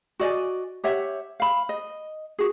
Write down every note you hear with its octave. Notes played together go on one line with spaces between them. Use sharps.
F#4 D5 D#5 G#5
G4 C#5 E5 F#5
F5 B5
D#5
F#4 G#4